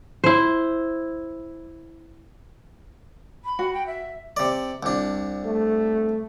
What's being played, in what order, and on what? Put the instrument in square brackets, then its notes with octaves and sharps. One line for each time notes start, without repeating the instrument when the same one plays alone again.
[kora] E4 C5
[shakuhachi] B5
[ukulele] F#4
[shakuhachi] G5
E5
[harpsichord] C3 D5
C2 D4
[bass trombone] A3